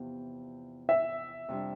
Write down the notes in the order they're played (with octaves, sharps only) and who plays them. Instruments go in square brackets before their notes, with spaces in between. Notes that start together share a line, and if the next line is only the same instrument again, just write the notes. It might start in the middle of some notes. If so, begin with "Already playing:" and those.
Already playing: [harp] E2 C3 F3 B3
[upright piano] E5
[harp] F2 C3 G3 D4